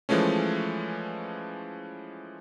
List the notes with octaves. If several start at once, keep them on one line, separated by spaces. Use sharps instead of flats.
E3 F3 G#3 A3 C#4